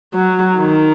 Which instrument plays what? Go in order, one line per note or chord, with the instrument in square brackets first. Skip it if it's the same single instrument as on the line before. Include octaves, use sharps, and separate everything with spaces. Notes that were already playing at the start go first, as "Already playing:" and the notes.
[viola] F#3
D#3